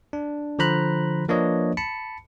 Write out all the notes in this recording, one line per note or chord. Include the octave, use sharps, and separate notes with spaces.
D4
D3 F3 C5 A#5 B5 F#6
F3 A#3 D4 B4 C#5 D#5
A5 B5 C#7